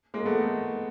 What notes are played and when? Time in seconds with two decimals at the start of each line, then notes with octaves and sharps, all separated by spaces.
0.14 G#3 A#3
0.25 A3 B3